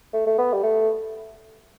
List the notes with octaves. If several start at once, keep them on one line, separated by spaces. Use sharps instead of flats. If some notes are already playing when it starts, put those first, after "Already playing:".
A3
A3
B3
G3
A3